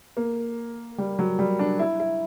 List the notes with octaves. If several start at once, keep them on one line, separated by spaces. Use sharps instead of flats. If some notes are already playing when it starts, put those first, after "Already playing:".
A#3
G3
F#3
G3
D4
E4
E4